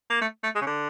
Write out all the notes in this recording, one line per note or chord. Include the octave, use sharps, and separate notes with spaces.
A#3
A3
A3
G#3
C#3
D3